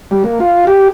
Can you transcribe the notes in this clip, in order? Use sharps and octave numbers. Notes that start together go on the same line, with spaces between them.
G3
A#3
F4
G4